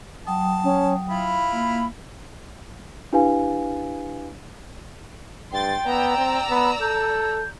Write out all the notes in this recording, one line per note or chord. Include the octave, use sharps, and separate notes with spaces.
F#3 G5 A5 D#6
C#4
E4 F4 B5
A#3
D4 E4 G4 B4 F5 G#5
G2 G5 C6 A6
B3 D5 A#5 E6
C4
B3 B5
A4 G6